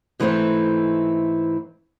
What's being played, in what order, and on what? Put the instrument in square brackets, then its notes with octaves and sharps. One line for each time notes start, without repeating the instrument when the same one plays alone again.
[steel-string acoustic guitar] G#2 E3 A3 C4 E4